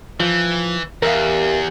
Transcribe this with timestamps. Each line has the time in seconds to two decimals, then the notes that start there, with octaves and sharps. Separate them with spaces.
0.20 E3 F3
1.02 E2 G3 A#4 E5 F5